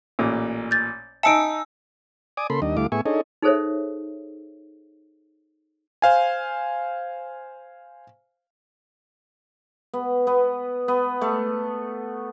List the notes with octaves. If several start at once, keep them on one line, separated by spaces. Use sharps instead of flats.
A1 A#2
G6 A6
D#4 E5 G#5 A5 E6 C#7 D7
D5 G#5 D6 D#6
C#3 A#3 A4 B5 C6
D#2 G3 D4 D#5
D2 G3 A3 E4 F5 D6
A2 B3 G#4 E5 G#5 C#6
D4 D#4 G#4 A4 C#5 D#5
D#4 G#4 A4 C5 C#5 E5
C5 F5 G#5
B3
B3
B3
A3